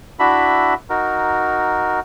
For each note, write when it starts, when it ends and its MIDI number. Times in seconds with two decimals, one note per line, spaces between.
0.19 0.74 62
0.19 0.74 64
0.19 0.74 66
0.19 0.74 76
0.19 0.74 83
0.90 2.00 63
0.90 2.00 66
0.90 2.00 70